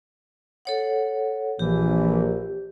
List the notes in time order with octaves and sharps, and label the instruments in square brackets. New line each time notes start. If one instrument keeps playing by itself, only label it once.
[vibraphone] A4 C#5 F#5
[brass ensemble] A#1 [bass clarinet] E3 [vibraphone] G4